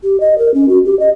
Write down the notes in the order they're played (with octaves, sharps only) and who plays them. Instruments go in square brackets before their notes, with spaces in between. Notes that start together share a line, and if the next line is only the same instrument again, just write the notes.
[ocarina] G4
D#5
A#4
C#4
F#4
G4
D#5